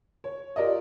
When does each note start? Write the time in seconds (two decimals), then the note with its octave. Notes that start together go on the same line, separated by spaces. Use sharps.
0.24 C#5
0.56 F4 G4 A#4 D5 D#5